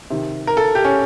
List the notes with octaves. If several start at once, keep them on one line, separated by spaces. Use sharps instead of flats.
C3 D#3
A#4
A4
G4
C#4